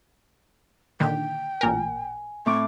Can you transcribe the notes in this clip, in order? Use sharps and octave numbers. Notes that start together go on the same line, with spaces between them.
A#2 D3 D#3 G5
A1 A#2 A#4 G#5
A2 C4 C#6 D6